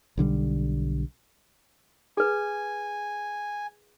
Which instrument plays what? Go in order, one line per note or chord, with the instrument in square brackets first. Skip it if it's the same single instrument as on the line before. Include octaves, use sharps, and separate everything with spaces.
[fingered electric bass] B1 D3 D#3 G3
[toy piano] G#4 B4 [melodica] G#5